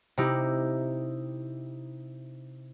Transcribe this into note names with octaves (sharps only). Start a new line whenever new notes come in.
C3 D#4 E4 G4